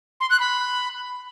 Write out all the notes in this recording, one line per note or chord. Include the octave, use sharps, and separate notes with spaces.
C6
F#6
B5